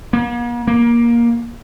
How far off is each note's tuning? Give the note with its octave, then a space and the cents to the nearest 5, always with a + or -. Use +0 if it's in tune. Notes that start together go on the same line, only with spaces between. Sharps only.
A#3 +45
A#3 +15